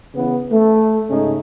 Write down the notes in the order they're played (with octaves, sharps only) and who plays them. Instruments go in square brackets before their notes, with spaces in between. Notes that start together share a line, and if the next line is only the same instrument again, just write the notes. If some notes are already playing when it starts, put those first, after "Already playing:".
[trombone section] C#3 E3 B3
A3
G#2 C#3 A3 C#4 D#4